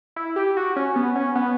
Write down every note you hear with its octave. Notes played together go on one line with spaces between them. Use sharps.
E4
G4
F#4
C#4
B3
C#4
B3